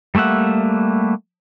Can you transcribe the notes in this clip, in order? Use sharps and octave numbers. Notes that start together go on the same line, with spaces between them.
G3 A3 A#3 E5 F#5